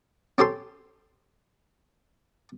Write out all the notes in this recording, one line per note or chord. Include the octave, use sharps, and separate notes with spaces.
C4 C#4 G4 A4 C6